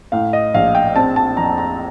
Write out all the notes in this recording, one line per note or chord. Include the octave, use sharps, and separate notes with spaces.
A2 F5
D#5
A#1 F5
G5
C4 A5
A5
F2 A#5
A#5